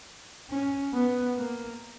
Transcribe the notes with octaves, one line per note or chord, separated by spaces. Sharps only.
C#4
B3
A#3